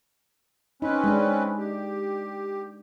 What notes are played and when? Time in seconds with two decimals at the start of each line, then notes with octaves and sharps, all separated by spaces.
0.82 C4 C#4 D#4 B4
1.04 G#3 D4
1.58 G4